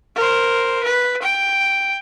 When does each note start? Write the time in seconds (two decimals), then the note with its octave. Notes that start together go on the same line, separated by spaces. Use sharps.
0.16 A#4 C5
0.83 B4
1.22 G5